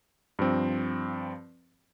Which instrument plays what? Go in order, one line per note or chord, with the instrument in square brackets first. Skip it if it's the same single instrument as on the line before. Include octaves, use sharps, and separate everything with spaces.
[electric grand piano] G2 F3 C4